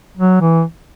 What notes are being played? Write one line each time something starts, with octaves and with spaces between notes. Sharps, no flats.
F#3
E3